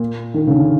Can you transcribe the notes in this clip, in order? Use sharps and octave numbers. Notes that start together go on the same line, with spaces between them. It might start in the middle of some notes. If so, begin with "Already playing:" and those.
Already playing: A#2
D#3
C#3
D3